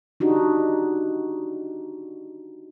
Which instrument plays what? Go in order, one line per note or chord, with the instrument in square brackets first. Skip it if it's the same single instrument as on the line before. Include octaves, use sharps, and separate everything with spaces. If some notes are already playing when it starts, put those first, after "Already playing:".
[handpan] D4 D#4 F#4 G4